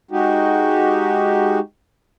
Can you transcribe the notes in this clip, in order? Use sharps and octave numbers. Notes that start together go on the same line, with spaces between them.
G#3 D#4 F#4 G4